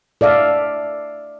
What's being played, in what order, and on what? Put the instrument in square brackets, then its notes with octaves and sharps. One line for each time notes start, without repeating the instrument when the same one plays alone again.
[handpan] A4 D5 E5 F5